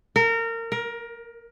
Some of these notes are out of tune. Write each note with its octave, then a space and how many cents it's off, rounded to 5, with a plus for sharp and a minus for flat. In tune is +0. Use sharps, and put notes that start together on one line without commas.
A#4 -25
A#4 +20